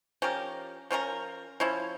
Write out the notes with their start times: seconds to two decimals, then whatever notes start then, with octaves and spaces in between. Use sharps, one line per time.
0.22 F3 C#4 G4 A#4
0.91 F3 C#4 G4 A#4
1.60 F3 C#4 E4